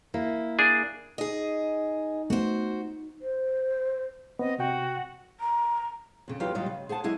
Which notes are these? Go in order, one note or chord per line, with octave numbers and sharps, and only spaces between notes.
A#3 E4
D4 G#4
D#4 G#4 D#5
A3 B3 F#4 C5
C5
B3 C4 D#5
C3 F#4 G5
A#5
F2 C#3
E2 F#3 D#4 F4 G4 B4
D2 G#2 F#3 G3 F4 D#5
C#3
G#4 C5 F#5 A5
F#3 G#3 E4 G#4 D#5